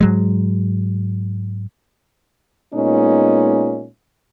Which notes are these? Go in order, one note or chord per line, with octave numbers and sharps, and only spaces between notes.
G#2 F#3 G#3
A#2 G#3 B3 C#4 D#4